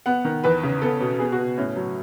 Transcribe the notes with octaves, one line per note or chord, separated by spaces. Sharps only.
B3 F#5
D#3
E2 B4
C#3
B3 A4
B2
B3 G#4
F#4
B2
A2 C#4
F#3